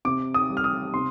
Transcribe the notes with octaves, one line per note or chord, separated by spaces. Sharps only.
C3 D6
D#6
G3
F6
D#6
C3 C6